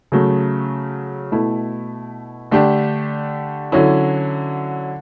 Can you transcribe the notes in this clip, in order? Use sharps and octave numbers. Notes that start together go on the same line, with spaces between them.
C#3 F#3 A3
B2 A3 E4
D3 A3 D4 G4
D3 F#3 C#4 E4